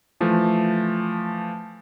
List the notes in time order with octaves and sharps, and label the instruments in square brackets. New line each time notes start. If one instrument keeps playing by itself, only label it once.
[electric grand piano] E3 F3 A3